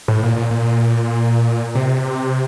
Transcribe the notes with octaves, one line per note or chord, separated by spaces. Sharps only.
A2
A#2
A#2
A#2
C3